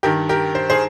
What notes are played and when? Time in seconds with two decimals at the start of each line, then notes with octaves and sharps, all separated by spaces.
0.03 G2 D#3 G4 A#4
0.29 G4 A#4
0.55 C5
0.70 G#4 C5